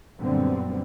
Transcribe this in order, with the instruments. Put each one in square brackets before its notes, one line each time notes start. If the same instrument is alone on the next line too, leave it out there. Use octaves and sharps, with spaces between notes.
[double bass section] F#2 A#2 D3 G3 B3 C4